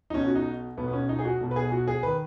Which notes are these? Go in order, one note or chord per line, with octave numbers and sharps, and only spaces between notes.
D#4
B1 B2 C#4
F#4
D#4
B1 B2 B3
B3
C#4
D#4
G#4
F#4
B1 B2
B4
G#4
F#4
G#4
D#3 B4